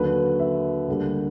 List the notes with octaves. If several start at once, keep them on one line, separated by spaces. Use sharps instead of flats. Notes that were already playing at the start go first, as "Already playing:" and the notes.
Already playing: D#2 D3 F#3 B4
E5
D2 D3 G3 A#3